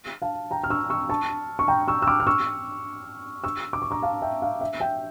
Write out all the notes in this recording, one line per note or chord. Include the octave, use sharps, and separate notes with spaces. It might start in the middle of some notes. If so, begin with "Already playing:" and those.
F5 A5
G5 A#5
F6
C#6 E6
C#6 E6
A5 C#6
C#6
G5 A#5
C#6 E6
E6
D6 F6
F6
C#6 E6
C#6 E6
D6
C#6
A#5 D6
F5 A5
E5 G5
F5
E5
E5 G5